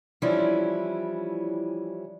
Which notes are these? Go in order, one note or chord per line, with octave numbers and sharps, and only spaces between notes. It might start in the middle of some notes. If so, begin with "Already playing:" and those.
E3 F3 G3 C#4 D4 E4